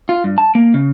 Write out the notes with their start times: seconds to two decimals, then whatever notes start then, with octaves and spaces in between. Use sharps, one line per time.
0.09 F4
0.24 G2
0.38 A5
0.55 A#3
0.74 C#3